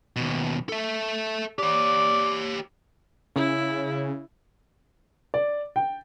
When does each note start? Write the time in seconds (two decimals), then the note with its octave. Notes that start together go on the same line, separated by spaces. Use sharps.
0.16 D#2 B2
0.69 A4 E5
1.59 G4 C#5 D5
3.36 C#3 E4
5.34 D5
5.76 G5